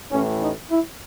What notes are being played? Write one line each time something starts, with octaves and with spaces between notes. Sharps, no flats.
A1 A2 E3 C#4
D#4
E4